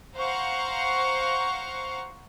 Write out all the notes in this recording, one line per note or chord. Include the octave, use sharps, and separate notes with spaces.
C5 F5 F#5 A#5 C#6